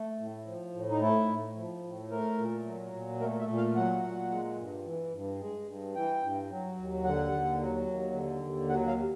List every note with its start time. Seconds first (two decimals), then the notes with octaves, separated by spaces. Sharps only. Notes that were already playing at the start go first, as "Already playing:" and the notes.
Already playing: A3
0.19 A2
0.46 F3
0.74 A2
0.90 D#4
1.01 A3 E4
1.28 A2
1.56 F3
1.84 A2
2.11 A3 A#4
2.38 A#2
2.65 F#3
2.93 A#2
3.20 A3 A#4
3.39 E5
3.48 A#2
3.57 F5
3.75 F#3 F#5
4.03 A#2
4.30 G#3
4.58 G2
4.85 E3
5.12 G2
5.40 G#3
5.67 G2
5.95 E3 G5
6.22 G2
6.50 F#3
6.77 D#2
7.04 D3 F#5
7.32 D#2
7.59 F#3
7.87 D#2
8.14 D3
8.42 D#2
8.69 F#3 F#5
8.87 F5